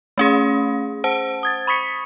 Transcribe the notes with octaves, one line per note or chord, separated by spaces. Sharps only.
A3 C#4 G#4
C5 F#5 A5
D#6 G#6 A6
B5 C#6 D#6 B6 C#7